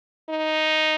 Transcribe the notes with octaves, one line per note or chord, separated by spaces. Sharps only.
D#4